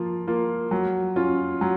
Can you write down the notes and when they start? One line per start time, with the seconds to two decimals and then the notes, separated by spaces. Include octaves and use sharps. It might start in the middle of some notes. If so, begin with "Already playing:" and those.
Already playing: F3 A#3 F4
0.27 A#3 F4
0.71 F#3
1.16 C#4 F4
1.61 F#3